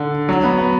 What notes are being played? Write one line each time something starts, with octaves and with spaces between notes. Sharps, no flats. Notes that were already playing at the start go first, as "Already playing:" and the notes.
Already playing: D3
F#3
B3
B3